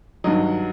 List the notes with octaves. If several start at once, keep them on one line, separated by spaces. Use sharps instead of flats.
G2 D#3 F#3 D#5